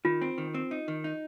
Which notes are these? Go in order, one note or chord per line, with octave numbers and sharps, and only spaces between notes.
D#3 F4
C4
D#3
C4
D#4
D#3
D#4